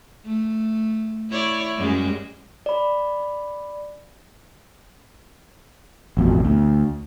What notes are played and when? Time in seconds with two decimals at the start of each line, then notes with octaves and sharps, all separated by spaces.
0.25 A3
1.30 E4 C#5 D5
1.77 F#2 G3 G#3
2.66 D5 B5
6.17 A1 F2 B2
6.44 D2